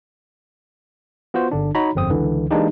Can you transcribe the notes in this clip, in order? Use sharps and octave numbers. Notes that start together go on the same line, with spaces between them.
B3 F4 F#4 C5
G1 D3 D4
D#4 F#4 C#5 A#5 B5
G1 F2 C4 D#6
C#2 D3 E3
E3 G#3 A#3 D4 D#4 G4